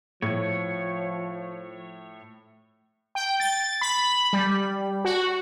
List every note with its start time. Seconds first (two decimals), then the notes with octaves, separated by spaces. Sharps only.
0.22 A2 F3 C#5
3.15 G5
3.40 A6
3.81 B5
4.33 G3
5.05 F#4